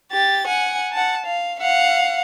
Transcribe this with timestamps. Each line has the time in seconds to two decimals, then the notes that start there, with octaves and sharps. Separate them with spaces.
0.12 G4 A6
0.47 F#5 G#5
0.92 F#5 A5
1.26 F5
1.60 F5 F#5